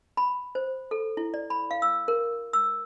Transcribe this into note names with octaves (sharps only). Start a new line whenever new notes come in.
B5
C5
A4
E4
D5
B5
F5
E6
A#4
E6